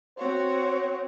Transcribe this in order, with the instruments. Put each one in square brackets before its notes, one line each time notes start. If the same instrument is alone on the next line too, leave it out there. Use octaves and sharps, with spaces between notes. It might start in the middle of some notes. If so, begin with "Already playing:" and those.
[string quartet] C4 F#4 C#5 [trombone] C5